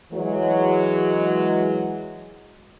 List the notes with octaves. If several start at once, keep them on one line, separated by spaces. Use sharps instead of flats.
E3 F#3 G#3